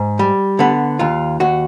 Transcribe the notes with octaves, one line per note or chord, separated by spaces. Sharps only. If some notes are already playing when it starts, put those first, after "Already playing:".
Already playing: G#2
G3
D3 B3
D#2 F4
D#2 F#4